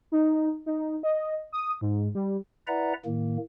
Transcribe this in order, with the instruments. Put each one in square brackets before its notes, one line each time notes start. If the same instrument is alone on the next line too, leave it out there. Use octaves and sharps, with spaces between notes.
[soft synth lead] D#4
D#4
D#5
D#6
G#2
G3
[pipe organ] E4 B4 D5 E5 F#5 A#5
A2 D#3 A#3